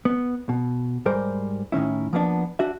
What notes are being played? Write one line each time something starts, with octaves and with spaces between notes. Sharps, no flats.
B3
B2
G#2 G3 A#4 C5 D5
A2 D#3 C#4 E4
F3 A#3 B3 D4
D4 F#4 E5